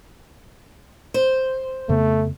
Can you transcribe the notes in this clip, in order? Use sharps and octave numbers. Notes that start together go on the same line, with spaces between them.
C5
F2 C#3 A3 B3